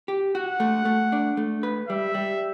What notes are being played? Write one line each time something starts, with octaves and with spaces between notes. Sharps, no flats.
G4
F#4 F#5
A3
A3
D4
A3
B4
G3 E5
G3